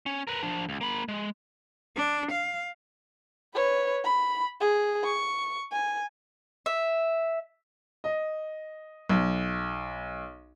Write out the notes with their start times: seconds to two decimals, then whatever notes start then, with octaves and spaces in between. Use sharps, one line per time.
0.06 C#4
0.27 A#4 B4
0.43 F3 D4
0.69 C#2
0.81 A#3 B5
1.08 G#3
1.96 D4
2.32 F5
3.55 B4 C#5
4.04 B5
4.61 G#4
5.04 C#6
5.72 G#5
6.66 E5
8.04 D#5
9.09 B1